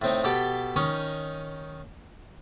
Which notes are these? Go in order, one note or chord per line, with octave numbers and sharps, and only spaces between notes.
A2 C4 D#4
B2 G4 A4 G5 A5 B5
D#3 C#4 D#4 C#5